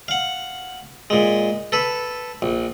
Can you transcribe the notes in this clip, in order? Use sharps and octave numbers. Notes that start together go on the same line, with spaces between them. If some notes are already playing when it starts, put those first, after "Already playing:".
F5 F#5
A#2 G#3
A4 B4
A#1